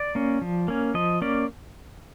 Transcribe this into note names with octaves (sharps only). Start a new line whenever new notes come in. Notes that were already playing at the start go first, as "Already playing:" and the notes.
Already playing: D5
A#3 C#4
F3
A#3 C#4
F3 D#5
A#3 C#4 D5